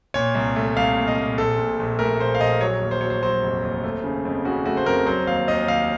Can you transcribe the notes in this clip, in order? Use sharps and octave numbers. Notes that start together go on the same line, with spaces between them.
A#2 C#5
C2
A3
C2 F5
A#2
D#5
A#2
A#1 A4
A#2
A#1
A3 A#4
A#2 C5
F5
A#1 D#5
F#3 C#5
D#2
C5
F#3 C#5
C5
F#3 C5
F1
D#2
A3
C#3
F2
C#3 F#4
A3 F#4
C5
F2 A#4
F#3 C5
D#2 F5
D#2 D#5
D#2 F5